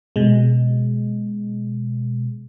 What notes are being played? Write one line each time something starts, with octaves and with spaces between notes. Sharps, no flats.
B2 G#3